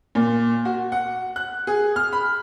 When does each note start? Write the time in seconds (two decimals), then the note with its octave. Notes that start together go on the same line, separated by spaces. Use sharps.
0.15 A#2
0.65 F#4
0.92 F#5
1.36 F#6
1.67 G#4
1.96 F6
2.13 B5